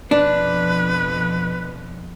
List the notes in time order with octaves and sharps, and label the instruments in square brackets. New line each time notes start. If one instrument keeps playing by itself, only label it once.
[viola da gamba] F2 B2 F3 [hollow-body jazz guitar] D4 [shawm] B4